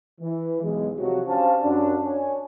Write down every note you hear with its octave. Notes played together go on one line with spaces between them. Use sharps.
E3
B1 G#3
C3 F3 F#3 F#4
C#4 D4 G4 C5 F5 A5
F#2 D4
C#5 G#5